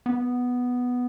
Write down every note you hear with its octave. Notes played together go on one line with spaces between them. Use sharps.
B3